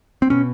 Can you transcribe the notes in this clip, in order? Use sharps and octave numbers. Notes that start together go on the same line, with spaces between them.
C4
B2 C#4